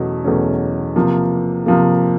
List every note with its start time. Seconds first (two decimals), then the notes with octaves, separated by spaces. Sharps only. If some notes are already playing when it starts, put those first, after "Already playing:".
Already playing: E2 B2 F#3 A3 C#4
0.25 E2 B2 F#3 A3 C#4
0.96 C3 F3 A#3
1.66 C3 F3 A#3